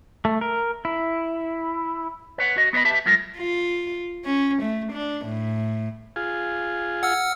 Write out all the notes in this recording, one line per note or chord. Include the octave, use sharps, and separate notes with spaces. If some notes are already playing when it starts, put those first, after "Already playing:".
A3
A#4
E4
B4 C#5 F#5
F#4 D#5
B3 B4 C5 D#5 B5
G4 B4 E5 A5
F#3 G#3 A3 F4 A#4
F4
C#4
A3
D4
A2
F4 G#4
F#5 E6 F6